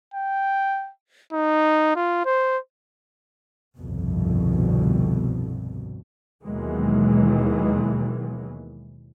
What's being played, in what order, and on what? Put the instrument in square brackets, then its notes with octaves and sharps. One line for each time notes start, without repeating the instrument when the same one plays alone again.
[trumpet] G5
D#4
F4
C5
[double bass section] G1 C2 F2 B2 D3
D#2 B2 D#3 E3 F#3 G#3